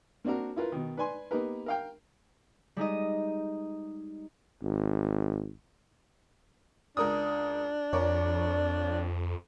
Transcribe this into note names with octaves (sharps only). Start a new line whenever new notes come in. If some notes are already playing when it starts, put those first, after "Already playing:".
A#3 C4 D4 F#4 A#4
E4 F4 A#4 B4
B2 D#3
B4 D5 G#5 C6
A#3 B3 D#4 G4 A#4 B4
A#4 F5 G5
G3 G#3 D#4 D#5
G#1
C#2 D4 A#4 D#6
F2 A#4 C#5 D5